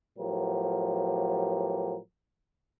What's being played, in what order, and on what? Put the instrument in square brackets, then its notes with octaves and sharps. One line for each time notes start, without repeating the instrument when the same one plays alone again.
[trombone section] A2 F3 F#3 B3 G4 A#4